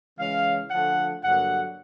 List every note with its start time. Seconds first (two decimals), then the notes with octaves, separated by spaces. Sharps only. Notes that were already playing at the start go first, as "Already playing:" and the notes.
0.18 C#3 E3 G#3 C#4 F5
0.70 D3 F3 A3 F#5
1.23 G2 D3 F#3 A#3 F#5